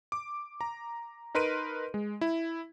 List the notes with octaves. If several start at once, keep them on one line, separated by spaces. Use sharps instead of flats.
D6
A#5
D#4 A#4 B4 C6 D7 D#7
G#3
E4